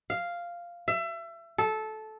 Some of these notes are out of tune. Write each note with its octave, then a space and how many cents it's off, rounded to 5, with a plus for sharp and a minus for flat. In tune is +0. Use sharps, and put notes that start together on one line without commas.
F5 -5
E5 +30
A4 -15